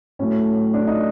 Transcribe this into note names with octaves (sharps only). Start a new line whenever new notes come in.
A2 F#3 A3 C#4
D4
D#4